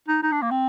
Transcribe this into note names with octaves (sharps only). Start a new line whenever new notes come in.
D#4
D#4
D4
A#3
C4